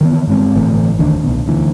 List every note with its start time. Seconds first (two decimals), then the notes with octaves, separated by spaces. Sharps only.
0.01 D#3 E3 B3
0.27 G2 G#3 C4
0.55 G1 A2 E3 A3
0.99 E1 D2 D#3 D4
1.24 C2 B2
1.48 D2 E3